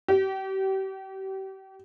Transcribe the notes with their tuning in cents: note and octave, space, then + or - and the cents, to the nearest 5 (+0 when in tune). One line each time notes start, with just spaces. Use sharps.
G4 -35